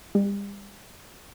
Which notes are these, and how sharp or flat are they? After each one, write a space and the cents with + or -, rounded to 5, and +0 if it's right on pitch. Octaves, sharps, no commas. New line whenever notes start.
G3 +40